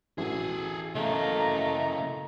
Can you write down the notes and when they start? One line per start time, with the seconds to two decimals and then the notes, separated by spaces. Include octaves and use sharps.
0.18 A1 E3 F#4 G#4 A4
0.95 C#3 A3 A#3 D#5 A#5